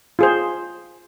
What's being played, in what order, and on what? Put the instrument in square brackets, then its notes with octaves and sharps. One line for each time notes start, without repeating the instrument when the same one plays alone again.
[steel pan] F4 G#4 C5